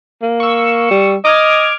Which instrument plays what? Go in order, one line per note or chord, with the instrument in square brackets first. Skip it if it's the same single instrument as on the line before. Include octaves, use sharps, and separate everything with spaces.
[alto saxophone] A#3
[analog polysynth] C#6 E6
[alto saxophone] G3
[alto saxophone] D#5 [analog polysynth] D6 F6 G#6